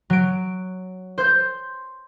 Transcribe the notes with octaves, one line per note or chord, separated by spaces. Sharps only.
F#3 D7
C5 G6